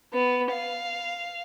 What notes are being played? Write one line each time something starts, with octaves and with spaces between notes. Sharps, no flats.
B3
F5